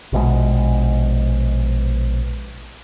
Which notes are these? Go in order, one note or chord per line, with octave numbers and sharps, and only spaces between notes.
A#1 B2 E3 G#3